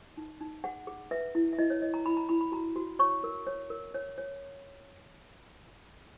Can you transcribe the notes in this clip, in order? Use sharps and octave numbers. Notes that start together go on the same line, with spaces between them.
D#4
D#4
G#4 F#5
G#4
B4 E5
E4
E5
E4 D#5
C#5
C#5 D#5
A#5
E4 B5
A#5
E4 B5
B5
F#4 A#5
F#4
C#5 C#6
A#4
C#5
A#4
C#5
C#5